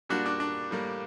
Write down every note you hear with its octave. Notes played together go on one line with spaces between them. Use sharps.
A#2 G3 A#3 D4 F#4
D4
D4
A2 G3 A#3